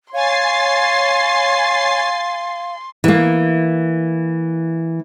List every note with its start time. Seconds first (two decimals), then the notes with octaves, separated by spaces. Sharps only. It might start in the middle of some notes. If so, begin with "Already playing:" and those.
0.14 C#5 F5 G#5 C6 A6 C7
3.04 E3 A#3